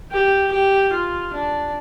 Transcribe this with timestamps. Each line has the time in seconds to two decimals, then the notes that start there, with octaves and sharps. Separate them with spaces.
0.12 G4
0.52 G4
0.93 F4
1.33 D4